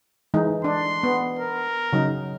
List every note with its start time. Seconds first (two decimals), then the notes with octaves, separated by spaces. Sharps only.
0.34 E3 G#3 D#4
0.64 D4 C6
1.03 B3
1.39 A#4
1.93 C#3 F#3 D#4